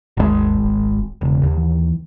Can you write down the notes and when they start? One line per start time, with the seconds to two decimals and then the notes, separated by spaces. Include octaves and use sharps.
0.17 G#1 D#2 C#3 G#3
0.62 D1
1.21 E1 C#3
1.43 D#2
1.57 E3